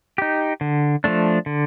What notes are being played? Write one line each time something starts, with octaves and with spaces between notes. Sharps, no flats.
D#4 G4
D3
F3 A3 D4
D3